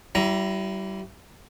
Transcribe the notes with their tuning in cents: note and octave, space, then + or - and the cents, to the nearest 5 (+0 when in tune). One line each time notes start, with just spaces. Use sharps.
G3 -35 E4 +15 A#5 +0